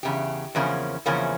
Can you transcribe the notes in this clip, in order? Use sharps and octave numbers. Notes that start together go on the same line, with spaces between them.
E2 C#3 G4
E2 C#3 F3 A#3 C#4
E2 C#3 F3 A#3 C#4